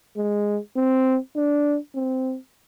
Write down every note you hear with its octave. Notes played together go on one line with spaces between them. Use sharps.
G#3
C4
D4
C4